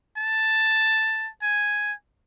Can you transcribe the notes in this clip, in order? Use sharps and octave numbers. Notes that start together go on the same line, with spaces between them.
A5
G#5